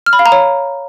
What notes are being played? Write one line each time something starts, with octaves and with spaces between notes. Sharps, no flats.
F6
B5
F5
A#5
C#5